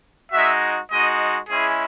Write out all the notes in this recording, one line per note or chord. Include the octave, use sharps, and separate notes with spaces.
G#3 D#4 F#4 E5
G#3 D#4 F#4 D#5
G#3 C#4 E4 G#4